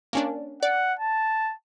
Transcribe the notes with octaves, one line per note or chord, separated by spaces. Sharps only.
A#3 C#4 D4
D5 F#5
A5